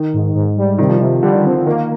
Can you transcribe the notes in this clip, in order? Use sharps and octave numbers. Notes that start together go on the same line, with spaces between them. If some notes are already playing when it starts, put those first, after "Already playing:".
Already playing: D#3
G#2
G#2
G3
C3 D#3
F3
C3 D#3
D3 G3
D#3
F3 C4
D3
D#3 A#3